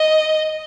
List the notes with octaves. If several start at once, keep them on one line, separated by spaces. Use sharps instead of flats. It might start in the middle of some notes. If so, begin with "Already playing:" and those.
Already playing: D#5